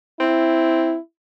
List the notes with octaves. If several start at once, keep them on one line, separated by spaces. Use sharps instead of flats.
C4 E4